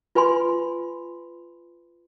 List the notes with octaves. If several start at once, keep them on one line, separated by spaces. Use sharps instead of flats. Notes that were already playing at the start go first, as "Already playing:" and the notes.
F4 B4 G#5 B5 C6